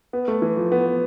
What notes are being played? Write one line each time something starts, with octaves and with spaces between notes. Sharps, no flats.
B3
A3
E3
F3
B3